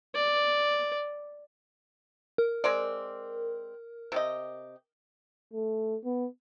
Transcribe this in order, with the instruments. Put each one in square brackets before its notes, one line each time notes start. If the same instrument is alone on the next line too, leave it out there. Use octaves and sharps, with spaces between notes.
[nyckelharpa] D5
[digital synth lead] A#4
[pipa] G#3 C4 D5
C3 G4 D#5
[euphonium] A3
B3